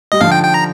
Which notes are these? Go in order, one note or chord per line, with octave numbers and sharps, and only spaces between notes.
G3 D#5
D3 F3 F5
G5
G5
A#5